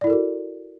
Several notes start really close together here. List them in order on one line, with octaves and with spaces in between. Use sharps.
D5 E4 A4 A#4 F#4